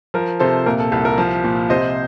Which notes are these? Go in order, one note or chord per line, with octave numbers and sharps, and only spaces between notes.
F3 A#4
C3 A4 C5
A#2 A#4
A4
C2 A4
A#4
F3
A#2
C3 C5 D#5